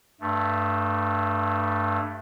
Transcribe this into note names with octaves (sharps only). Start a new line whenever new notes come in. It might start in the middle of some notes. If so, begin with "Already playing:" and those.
G2 A3